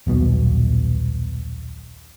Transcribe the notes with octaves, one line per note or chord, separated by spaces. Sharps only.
D#1 B1 B2